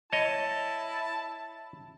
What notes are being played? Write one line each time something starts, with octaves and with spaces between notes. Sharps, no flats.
E4 C#5 D#5 A5